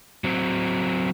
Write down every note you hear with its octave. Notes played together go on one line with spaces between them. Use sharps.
F#3 C4